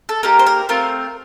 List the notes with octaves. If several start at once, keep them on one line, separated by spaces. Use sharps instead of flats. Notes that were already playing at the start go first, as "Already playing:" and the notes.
A4
A#3 D#4 G4 A#4
C5
A#4
A3 C4 F4 A#4